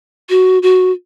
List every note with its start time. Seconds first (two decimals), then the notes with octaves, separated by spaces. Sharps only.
0.30 F#4
0.63 F#4